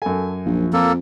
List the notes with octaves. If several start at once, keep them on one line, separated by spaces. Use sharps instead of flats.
F#2 A4 G#5
A#1 F3
F2 A#3 A4